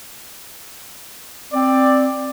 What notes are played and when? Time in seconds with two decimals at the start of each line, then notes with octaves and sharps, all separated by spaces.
1.53 C4 D5